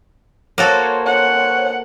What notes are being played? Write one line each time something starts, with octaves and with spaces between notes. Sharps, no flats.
A#3 F#4 A4 C5 C#5
F#5